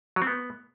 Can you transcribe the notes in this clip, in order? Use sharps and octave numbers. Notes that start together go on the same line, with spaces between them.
F#3
C4
B3